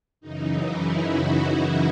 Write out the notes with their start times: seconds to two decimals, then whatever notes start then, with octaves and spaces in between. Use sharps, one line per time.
0.21 F#2 C#3 E3 D#4
0.61 E4
1.01 F#4
1.41 F#4